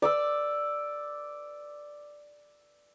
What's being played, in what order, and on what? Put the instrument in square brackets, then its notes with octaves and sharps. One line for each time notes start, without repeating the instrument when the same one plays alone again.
[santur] D5 D6 E6